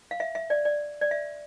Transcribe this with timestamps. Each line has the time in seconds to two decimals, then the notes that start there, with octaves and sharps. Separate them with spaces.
0.11 F5
0.20 E5
0.35 E5
0.50 D5
0.65 D5
1.01 D5
1.11 E5